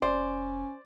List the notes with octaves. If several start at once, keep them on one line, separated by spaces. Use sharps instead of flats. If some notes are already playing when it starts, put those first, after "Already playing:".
F1 C#4 C5 D5